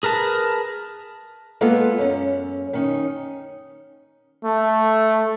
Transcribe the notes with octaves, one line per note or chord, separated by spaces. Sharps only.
G#4 A#4 B4 A5
G#3 A#3 B3 F4 A4
F#2 C#4
D#3 C#4 D#4
A3